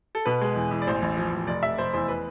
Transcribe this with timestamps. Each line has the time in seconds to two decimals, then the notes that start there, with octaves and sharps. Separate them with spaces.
0.15 A4
0.25 B2 B4
0.41 G#3
0.56 E2
0.71 E2
0.82 D5
0.87 A1 C5
1.02 A1
1.17 F3
1.32 A1
1.47 F1 D5
1.63 F1 E5
1.78 F1 C5
1.93 E2 C5
2.08 B4